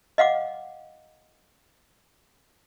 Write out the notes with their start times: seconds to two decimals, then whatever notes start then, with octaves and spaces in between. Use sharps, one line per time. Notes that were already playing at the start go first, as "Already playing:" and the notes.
0.18 D#5 F5 F#5 D6